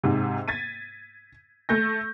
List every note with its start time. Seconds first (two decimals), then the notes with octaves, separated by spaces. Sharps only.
0.03 G#2 C3
0.48 G#6 A6 B6 D#7
1.69 A3 G6 A#6